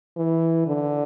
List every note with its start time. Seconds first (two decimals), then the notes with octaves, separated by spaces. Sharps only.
0.17 E3
0.67 D3